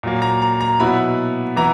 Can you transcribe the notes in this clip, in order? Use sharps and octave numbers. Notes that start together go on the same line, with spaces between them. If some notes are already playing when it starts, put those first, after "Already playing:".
A#2 F#3 A#3
A#5
A#5
A#5
B2 F#3 B3 E4 B5
E3 B3 E4 A#5